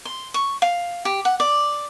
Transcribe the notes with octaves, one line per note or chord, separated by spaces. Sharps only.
C6
C#6
F5
G4
F#5
D5